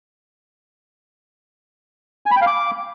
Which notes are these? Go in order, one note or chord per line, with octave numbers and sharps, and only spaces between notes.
G#5
B5
G5
F5
D6